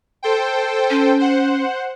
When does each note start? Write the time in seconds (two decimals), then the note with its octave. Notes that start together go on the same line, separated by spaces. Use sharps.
0.23 A4 C5 G5
0.90 C#4
1.19 C5 F#5